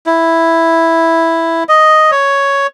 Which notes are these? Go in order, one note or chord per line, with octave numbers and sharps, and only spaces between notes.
E4
D#5
C#5